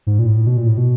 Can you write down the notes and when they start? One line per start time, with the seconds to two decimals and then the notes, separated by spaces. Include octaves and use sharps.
0.07 G#2
0.19 A#2
0.26 A2
0.47 B2
0.57 A#2
0.67 A2
0.77 B2